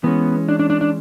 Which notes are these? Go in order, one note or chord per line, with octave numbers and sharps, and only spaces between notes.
E3 G#3 B3 C#4
D4
D4
D4
D4